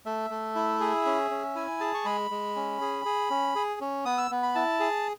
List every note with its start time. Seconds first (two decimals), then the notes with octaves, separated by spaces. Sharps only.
0.06 A3 E5
0.30 A3
0.55 E4
0.81 G#4
1.06 C#4
1.31 C#4
1.55 E4 G#5
1.80 G#4 A5
1.94 C#6
2.05 G#3 B5
2.31 G#3
2.56 C#4
2.81 G#4
3.05 G#4
3.30 C#4
3.56 G#4
3.81 C#4
4.05 B3 D#6
4.18 E6
4.31 B3
4.43 B5
4.55 E4 A5
4.80 G#4